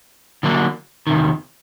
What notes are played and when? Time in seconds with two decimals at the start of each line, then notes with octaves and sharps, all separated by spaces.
0.43 D3 F#3 A#3 D4
1.07 E2 C3 D#3